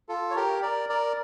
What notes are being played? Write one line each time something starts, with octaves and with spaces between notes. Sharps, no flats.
F4 A4
C#5
G4 A#4
A#4 D5
A#4 D5